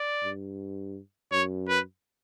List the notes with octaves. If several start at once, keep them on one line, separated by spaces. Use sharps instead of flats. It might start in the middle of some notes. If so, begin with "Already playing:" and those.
Already playing: D5
G2
F#2 C#5
B4